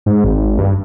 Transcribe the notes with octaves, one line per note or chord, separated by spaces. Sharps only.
G#2
G#1
G2